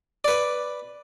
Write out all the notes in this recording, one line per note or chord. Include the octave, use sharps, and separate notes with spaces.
B4 D5